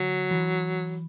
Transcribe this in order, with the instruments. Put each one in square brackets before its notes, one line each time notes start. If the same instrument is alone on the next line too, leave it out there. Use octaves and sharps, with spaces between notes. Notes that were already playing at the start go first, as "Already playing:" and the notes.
Already playing: [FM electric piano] D3 [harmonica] F#3
[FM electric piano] E3